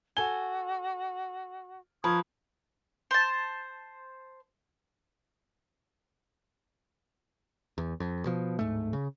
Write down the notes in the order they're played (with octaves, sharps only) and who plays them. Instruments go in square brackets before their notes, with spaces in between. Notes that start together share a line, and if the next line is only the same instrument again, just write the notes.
[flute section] F#4 [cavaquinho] A4 G#5 [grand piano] G7
[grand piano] F3 [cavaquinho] A#4 B4 [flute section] C#6 D#6 G#6
[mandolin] C5 A5
[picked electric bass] E2
F2
B2 F3
D1 G#2 A3
C#3